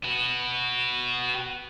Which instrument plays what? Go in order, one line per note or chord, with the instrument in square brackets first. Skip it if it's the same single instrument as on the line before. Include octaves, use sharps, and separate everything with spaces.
[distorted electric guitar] F#4 B4